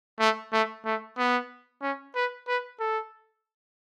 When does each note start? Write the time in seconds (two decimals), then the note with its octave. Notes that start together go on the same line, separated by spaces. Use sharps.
0.20 A3
0.53 A3
0.85 A3
1.18 B3
1.82 C#4
2.15 B4
2.47 B4
2.80 A4